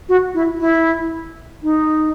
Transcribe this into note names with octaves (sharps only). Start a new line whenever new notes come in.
F#4
E4
E4
D#4